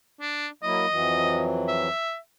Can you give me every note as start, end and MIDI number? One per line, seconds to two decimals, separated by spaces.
0.21 0.47 62
0.63 0.86 54
0.63 0.86 58
0.63 0.86 64
0.63 1.44 75
0.90 1.88 41
0.90 1.88 52
0.90 1.88 54
1.68 2.16 76